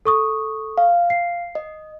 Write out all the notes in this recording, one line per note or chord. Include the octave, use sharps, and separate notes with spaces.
A4 C#6 D#6
F5
C7
D#5